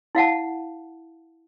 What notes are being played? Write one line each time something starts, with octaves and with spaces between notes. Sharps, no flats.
E4 F5 F#5 A5